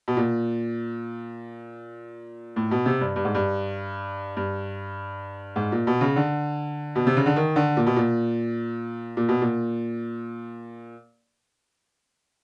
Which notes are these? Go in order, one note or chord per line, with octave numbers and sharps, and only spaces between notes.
B2
A#2
A2
B2
C3
G2
G2
G#2
G2
G2
G#2
A#2
B2
C#3
D3
B2
C3
C#3
D3
D#3
D3
A#2
B2
A#2
A#2
B2
A#2